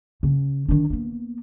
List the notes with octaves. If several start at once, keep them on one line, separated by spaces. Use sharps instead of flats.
C#3 C#4
D#3 D4
A#3 B3